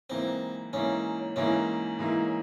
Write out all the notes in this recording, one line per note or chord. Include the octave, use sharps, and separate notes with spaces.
G#2 E3 A#3 C4 E4
G#2 E3 A#3 C#4 E4
G#2 E3 A#3 C#4 E4
G#2 E3 A#3 E4